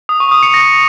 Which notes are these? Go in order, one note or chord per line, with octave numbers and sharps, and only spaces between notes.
D#6
C#6
D#6
C#7
A#6